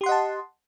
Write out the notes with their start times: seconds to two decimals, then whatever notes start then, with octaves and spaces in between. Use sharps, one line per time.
0.01 G4
0.04 C6
0.06 F#5
0.09 D#5
0.12 A5